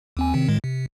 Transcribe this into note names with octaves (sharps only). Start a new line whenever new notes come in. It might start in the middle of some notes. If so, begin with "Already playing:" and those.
D#2 C4 G#5
C3 D#3 C4
A2 D#3 G#3
C3